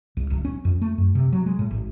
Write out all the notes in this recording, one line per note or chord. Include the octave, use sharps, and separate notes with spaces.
C2
D1
C#4
F2
A3
F#2
C3
F#3
G#3
A2
G#1